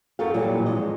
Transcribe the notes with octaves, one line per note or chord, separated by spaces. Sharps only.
F#2 F#3 F4 A4 A#4 F5
A#2 E3 F#3 G3
F2 G#3 D#5